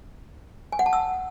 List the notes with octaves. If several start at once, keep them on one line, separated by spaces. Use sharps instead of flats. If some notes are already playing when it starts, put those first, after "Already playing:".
G#5
F#5
A5
E6